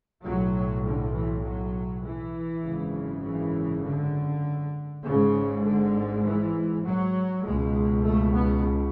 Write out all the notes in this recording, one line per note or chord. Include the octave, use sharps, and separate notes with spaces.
B1 A2 F#3
D3
E3
F#3
E3
G#1 F#2 C#3
E3
D3
G#1 G#2 C#3
D3
E3
F#3
C#2 B2 G#3
A3
B3